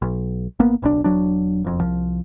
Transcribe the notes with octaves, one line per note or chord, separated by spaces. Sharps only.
B1
G#1 A#3 B3
D1 B1 B2 D4
E1 F#3 D4
E1 F2
C2 F3